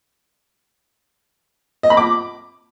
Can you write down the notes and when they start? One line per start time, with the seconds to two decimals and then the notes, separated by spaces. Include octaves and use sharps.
1.83 D#5
1.90 B5
1.97 D6